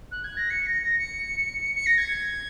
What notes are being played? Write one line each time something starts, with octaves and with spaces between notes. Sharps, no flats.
F#6
G#6
A#6
C#7
A#6
A#6
C#7
C#7
A#6
G#6